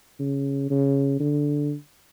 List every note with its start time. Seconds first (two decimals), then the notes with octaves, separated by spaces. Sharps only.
0.19 C#3
0.70 C#3
1.20 D3